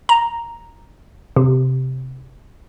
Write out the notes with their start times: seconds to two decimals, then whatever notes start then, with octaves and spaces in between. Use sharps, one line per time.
0.09 A#5
1.36 C3